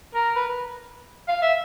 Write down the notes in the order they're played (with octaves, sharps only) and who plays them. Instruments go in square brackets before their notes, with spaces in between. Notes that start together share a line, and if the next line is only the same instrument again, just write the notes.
[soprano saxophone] A#4
B4
F5
E5